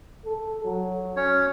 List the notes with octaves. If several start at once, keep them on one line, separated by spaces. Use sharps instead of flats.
A4
F#3
C#4 C#5